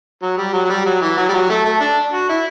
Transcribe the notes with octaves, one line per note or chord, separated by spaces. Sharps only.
F#3
G3
F#3
F#3
G3
F#3
E3
F#3
G3
F#3
A3
A3
D4
F#4
E4